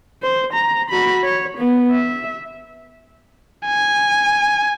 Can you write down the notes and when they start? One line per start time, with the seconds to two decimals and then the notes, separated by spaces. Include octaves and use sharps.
0.23 C5
0.53 A#5
0.90 F#4 B5
1.24 C#5
1.58 B3
1.91 E5
3.67 G#5